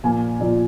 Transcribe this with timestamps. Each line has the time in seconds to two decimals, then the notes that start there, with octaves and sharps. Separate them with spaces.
0.04 A#2 F3 A#3 G#5
0.40 A#2 F3 A#3 D5